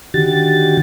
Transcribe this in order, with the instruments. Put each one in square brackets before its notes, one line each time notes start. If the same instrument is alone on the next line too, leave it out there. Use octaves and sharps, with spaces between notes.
[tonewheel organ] D3 D#3 F#4 G4 A6